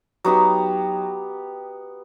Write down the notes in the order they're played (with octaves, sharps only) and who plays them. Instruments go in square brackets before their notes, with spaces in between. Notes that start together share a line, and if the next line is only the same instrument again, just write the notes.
[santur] F#3 B3 D#4 G4